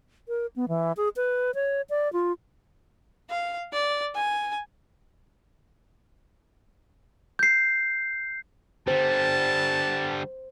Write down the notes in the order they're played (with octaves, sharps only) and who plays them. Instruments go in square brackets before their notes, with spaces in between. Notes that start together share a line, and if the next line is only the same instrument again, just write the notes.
[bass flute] A#4
B3
E3
G#4
B4
C#5
D5
F4
[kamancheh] F5
D5
G#5
[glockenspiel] G6 C7
[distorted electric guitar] D3 G3 [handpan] C5 [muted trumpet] A5